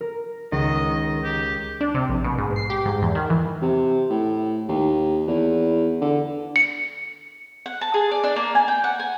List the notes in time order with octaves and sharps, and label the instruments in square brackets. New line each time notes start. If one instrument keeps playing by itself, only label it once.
[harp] A#4
[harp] C#2 E7 [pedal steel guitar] D#3 [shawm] D#5
[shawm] G4
[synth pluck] D4
C3
A#1
B2
G#2
C7
G4
G#2
E2
D#3
E3
[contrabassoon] C3
A2
D#2
E2
D3
[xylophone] C#7
[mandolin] F#5
A5
G#4
D5
D4
A#3
G#5
G5
F#5
G#5